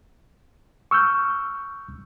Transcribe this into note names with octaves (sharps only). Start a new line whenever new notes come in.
C#6 E6 F6 G6